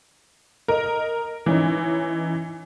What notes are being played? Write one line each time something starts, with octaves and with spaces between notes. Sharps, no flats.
A#4 D#5
E3 C#4 D#4